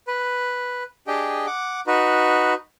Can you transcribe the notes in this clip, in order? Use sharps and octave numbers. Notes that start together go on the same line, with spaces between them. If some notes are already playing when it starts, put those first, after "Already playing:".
B4
D4 G4 G#4 D#5 G5
F#5 D6
D#4 F#4 B4